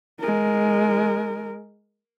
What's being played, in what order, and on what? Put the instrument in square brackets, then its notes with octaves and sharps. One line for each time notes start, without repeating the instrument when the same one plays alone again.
[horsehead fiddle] G#3 A#4